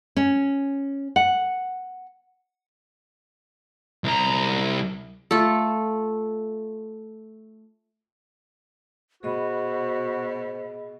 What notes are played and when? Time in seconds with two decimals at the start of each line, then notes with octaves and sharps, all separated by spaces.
0.16 C#4
1.16 F#5
4.04 C2 A#5
5.31 A3 F4 A4
9.23 B2 F#4 G#4 C5 D#5 B5